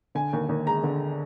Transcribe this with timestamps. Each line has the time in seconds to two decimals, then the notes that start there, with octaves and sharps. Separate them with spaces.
0.15 D3 G#5
0.33 D#2
0.49 D#2
0.66 G#3 A#5
0.83 D3